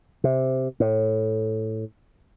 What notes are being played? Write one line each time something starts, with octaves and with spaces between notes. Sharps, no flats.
C3
A2